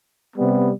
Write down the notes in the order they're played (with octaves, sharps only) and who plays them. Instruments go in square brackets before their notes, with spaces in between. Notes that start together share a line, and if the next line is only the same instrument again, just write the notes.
[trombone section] C3 G3 B3